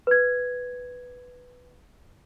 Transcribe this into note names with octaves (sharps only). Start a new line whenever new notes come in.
B4 G#6